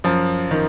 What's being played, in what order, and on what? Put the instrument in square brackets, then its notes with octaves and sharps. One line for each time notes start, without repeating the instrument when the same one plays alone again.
[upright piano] F#2 F3
D#3